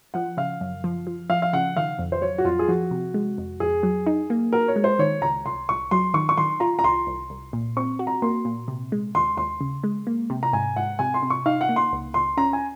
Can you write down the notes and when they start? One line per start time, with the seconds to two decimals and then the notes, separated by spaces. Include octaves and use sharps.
0.14 F3 F#5
0.37 C#3 F5
0.61 F#2
0.84 F3
1.07 F3
1.30 F3 F5
1.42 F5
1.53 C#3 F#5
1.77 D#3 F5
1.99 F2
2.12 C5
2.22 F#3 C#5
2.38 F#4
2.45 F2 F4
2.59 G#4
2.68 F3 F#4
2.91 C3
3.14 G#3
3.38 F2
3.60 F2 G#4
3.83 F#3
4.07 D#4
4.30 A#3
4.53 F#4 A#4
4.68 C#5
4.76 G#3
4.84 C5
4.99 D#3 C#5
5.22 C#2 A#5
5.46 C2 C6
5.69 C2 C#6
5.91 F#3 C6
6.14 D#3 C#6
6.29 C#6
6.38 D#3 C6
6.60 F4 A#5
6.79 A#5
6.84 C2 C6
7.07 C2
7.30 C2
7.53 A#2
7.77 C4 C#6
7.99 F#4
8.07 A#5
8.22 A#3 C6
8.45 A#2
8.68 C3
8.92 G#3
9.15 D#2 C6
9.37 D#2 C6
9.61 C#3
9.84 G#3
10.07 A#3
10.30 C3
10.43 A#5
10.53 G#2 G#5
10.76 G#2 F#5
10.99 C3 G#5
11.14 C6
11.23 C3
11.30 C#6
11.46 D#4 F5
11.61 F#5
11.69 A#3
11.76 C6
11.92 C#2
12.14 C#2 C6
12.37 C#4 A#5
12.53 G#5